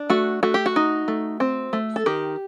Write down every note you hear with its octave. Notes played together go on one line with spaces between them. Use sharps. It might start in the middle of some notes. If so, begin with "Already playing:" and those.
Already playing: D4
A3 F#4
A3 F#4
G4
F#4
D#4
A3
C4
A3
A4
D#3 G4